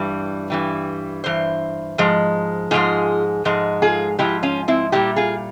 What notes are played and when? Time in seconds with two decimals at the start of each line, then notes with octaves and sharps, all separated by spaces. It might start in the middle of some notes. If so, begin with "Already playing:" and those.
Already playing: G2 E3 G3
0.50 G2 E3 G3
1.24 G2 E3 C5
1.98 G#2 F3 G#3
2.71 G#2 F3 G#3 F4 G#4
3.45 G#2 F3 G#3
3.82 F4 G#4
4.19 G#2 F3 G#3 E4 G4
4.43 C#4 F4
4.68 C4 E4
4.92 A#2 G3 E4 G4
5.16 F4 G#4